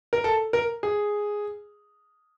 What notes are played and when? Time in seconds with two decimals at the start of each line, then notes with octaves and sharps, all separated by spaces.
0.13 A#4
0.24 A4
0.53 A#4
0.83 G#4